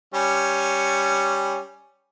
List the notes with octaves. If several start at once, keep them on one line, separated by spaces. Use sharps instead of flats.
G3 C#4 C#6